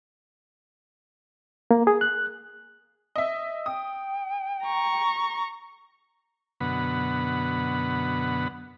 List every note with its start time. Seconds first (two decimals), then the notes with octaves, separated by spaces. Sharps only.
1.71 A#3
1.87 G#4
2.01 F#6
3.16 D#5 E5
3.66 G5 D#6
4.64 A#5 C#6
6.61 F#2 B2 D3 B3 F#5 B5